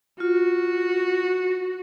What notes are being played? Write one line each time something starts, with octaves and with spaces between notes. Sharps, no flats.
F4 F#4